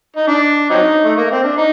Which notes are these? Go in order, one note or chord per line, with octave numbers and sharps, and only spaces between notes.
D#4
D4
F#3 C4 D#4
A3
A#3
C4
D4
D#4